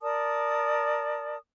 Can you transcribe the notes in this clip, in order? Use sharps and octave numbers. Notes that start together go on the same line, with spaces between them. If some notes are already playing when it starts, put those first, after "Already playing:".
A#4 D5 A5 D#6